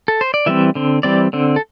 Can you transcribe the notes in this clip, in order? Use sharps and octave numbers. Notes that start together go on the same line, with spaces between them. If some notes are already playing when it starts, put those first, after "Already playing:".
A4
C5
D5
E3 G3 C4 E5
D3 C4
E3 G3 C4 D5
D3 C4
A4